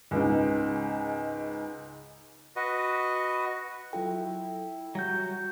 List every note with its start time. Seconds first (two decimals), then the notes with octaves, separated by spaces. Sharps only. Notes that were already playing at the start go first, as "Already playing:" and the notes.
0.11 C#2 G#2
2.56 F#4 B4 D#5
3.93 F#3 E4 F4 A4 G5
4.95 F#3 G3 F#4 G6